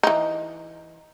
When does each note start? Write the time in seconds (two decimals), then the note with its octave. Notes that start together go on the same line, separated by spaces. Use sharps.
0.03 E3 D#4